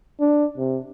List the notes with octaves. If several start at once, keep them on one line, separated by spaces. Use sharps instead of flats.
D4
C3